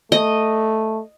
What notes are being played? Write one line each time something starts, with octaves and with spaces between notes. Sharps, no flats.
A3 D#5